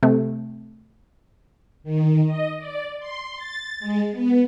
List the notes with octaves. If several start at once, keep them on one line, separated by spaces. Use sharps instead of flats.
C3 A3
D#3
D#5
D5
C6
A6
G#3
B3